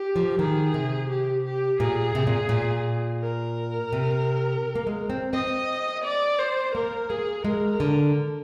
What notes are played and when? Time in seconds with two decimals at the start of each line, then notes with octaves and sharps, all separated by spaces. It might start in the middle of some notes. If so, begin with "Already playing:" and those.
Already playing: G4
0.16 F3
0.39 D#3 G#4
0.74 C3
1.09 G4
1.45 G4
1.80 A#2 G#4
2.15 C3
2.27 A#2
2.49 A#2
3.21 A#4
3.93 C3
4.75 A#3
4.87 G#3
5.10 C4
5.33 C4 D#5
6.04 D5
6.38 C5
6.74 A#3 A#4
7.09 A#3 G#4
7.45 G#3 A#4
7.80 D3